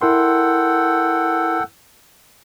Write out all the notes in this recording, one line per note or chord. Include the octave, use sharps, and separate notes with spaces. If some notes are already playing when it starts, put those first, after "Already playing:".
E4 A4 A#4 F#5 G5 C6